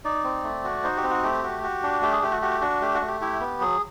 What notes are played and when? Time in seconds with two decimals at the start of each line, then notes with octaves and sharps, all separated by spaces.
0.05 D#4 D5
0.24 C4
0.44 A3
0.64 F#4
0.83 D#4 C5
0.97 G4
1.03 C4
1.10 F#4
1.23 A3 G4
1.43 F#4
1.63 F#4
1.83 D4
2.02 A3 G4
2.12 G#4
2.22 A3 G4
2.32 F#4
2.42 F#4 G4
2.61 D4 F#4
2.82 A3 G4
2.95 F#4
3.01 A3
3.08 G4
3.21 E4 G4
3.41 B3
3.60 F#3 G#4